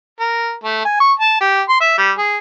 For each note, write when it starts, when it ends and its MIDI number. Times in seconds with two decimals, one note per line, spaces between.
0.20 0.54 70
0.64 0.83 57
0.85 0.97 80
1.00 1.12 85
1.20 1.36 81
1.41 1.62 67
1.69 1.80 84
1.81 1.94 76
1.98 2.12 55
2.18 2.38 68